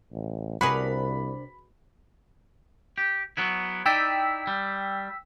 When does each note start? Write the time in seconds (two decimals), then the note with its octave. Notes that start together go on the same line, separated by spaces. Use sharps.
0.12 A1
0.61 C2 C3 D4 F#4 G#4 A#4 B4 B5
2.98 G4
3.37 F#3 B3 E4
3.86 D#4 E4 D5 G5 E6 B6
4.47 G3